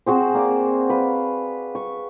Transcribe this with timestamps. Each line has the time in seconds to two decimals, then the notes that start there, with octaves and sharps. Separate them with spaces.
0.06 C4 F#4 G#4 C5
0.34 A#3 D5 D6
0.90 B4 F5
1.75 C#6